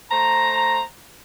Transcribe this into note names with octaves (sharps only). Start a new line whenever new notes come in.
A3 C5 A#5